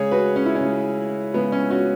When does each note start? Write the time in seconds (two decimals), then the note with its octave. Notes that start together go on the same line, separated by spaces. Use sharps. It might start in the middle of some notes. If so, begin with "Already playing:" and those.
Already playing: C#3 G#3 G#4 C#5
0.11 F#4 B4
0.36 C#4
0.46 E4
0.55 C#3 C#4
0.65 G#3
1.34 C#3 G#3 B3
1.52 C#4
1.70 C#4 F#4